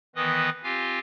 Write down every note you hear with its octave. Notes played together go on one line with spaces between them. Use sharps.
D#3 E3 B3 B4 D#5 D#6
C4 F4 G4 F5 G#5